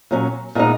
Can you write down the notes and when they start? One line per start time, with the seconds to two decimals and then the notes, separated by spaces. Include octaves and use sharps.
0.11 A#2 F#3 C#4
0.55 A#2 G#3 B3 D#4